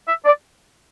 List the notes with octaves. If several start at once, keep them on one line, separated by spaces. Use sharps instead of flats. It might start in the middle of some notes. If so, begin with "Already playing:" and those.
E5
D5